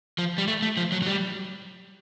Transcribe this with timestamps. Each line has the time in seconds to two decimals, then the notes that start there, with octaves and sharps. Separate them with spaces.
0.18 F3
0.38 G3
0.48 A3
0.62 A3
0.77 F3
0.92 F#3
1.02 F#3
1.06 G3